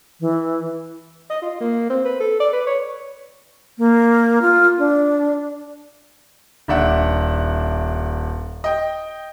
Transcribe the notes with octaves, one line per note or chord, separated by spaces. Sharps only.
E3
D#5
F4
A#3
C4
B4
A4
D5
B4
C#5
A#3
F4
D4
D#1 D4 E5 F#5
D#5 G5